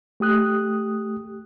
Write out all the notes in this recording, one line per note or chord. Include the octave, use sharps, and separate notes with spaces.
A3 G4 D#6 F#6